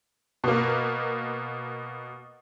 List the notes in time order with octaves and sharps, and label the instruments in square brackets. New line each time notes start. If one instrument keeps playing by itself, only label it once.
[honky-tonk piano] B2 A#3